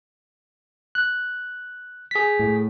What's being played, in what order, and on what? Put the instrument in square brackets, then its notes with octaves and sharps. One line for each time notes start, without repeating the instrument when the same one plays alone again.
[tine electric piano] F#6
G#4 B6
[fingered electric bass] A2